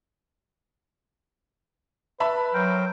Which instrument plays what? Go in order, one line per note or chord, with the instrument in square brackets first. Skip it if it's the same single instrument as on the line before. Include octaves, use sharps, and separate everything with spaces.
[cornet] B4 [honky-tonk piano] E5 A5 B5
[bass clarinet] F#3 [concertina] A#4 C5 G5